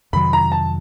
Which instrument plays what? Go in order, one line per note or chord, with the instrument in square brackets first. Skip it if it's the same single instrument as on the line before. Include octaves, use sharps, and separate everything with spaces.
[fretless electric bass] F2 C3 D#3 F#3 [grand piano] B5
[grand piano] A#5
A5